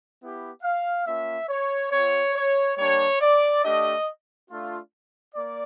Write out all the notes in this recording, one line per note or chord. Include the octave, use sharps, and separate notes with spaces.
B3 E4 G4
F5
A#3 C#4 F4 E5
C#5
C4 F4 C#5
C#5
G3 A#3 D4 G4 C#5
D5
A3 D4 G4 D#5
A3 D4 F4
A#3 D5